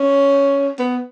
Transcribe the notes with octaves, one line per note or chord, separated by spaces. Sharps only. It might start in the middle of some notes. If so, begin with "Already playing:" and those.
Already playing: C#4
B3